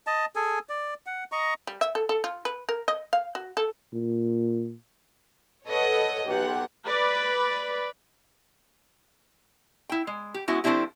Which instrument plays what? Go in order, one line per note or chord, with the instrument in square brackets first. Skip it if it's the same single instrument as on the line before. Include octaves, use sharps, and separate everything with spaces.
[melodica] D#5 A5
G#4 A4 G#5
D5
F#5
D#5 A#5 C#6
[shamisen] G3
E5
A4
A4
F4
B4
A#4
D#5
F5
F#4
A4
[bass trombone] A#2
[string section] A4 B4 C#5 D#5 F#5
B1 G4 F#5
[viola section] B4 D5 B5
[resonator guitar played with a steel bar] E4 G5
G#3
G4
G#3 B3 C#4 E4 F#4
F3 A3 C4 D4 E4 G4